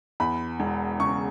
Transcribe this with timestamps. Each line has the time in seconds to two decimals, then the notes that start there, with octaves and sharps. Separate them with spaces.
0.20 E2 B5
0.60 E1
1.00 C#3 C#6